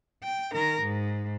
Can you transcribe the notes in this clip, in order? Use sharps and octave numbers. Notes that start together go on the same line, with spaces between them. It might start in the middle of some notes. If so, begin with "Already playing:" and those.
G5
D#3 A#4
G#2